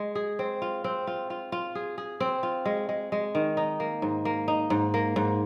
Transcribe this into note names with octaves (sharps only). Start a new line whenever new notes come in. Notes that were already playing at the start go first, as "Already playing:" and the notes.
Already playing: G#3
G#4
C4
F4
C4
F4
F4
F4
G#4
G#4
C4
F4
G#3
G#3
G#3
D#3
D#4
A#3
G#2
A#3
D#4
G#2
A#3
G#2